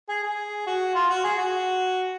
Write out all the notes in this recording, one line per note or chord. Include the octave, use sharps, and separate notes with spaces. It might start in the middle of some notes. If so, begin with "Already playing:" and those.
G#4
G#4
F#4
F4
F#4
G#4
F#4